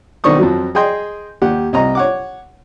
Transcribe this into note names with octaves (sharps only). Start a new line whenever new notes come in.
B1 D#3 C4 D4 C#6 D#6
F2 F3 F#3
G#4 D#5 G5 C6
D#2 G4 F#5
C2 D#5 A#5
C#5 F#5 D6